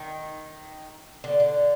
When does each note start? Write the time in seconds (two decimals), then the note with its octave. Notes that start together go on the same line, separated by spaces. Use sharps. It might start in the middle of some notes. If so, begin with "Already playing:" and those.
Already playing: D#3
1.24 D3
1.40 D3